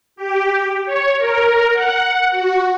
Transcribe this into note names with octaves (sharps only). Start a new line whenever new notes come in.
G4
C#5
A#4
F#5
F#4